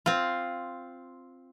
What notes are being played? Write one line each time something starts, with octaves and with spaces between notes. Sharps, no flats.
C4 F4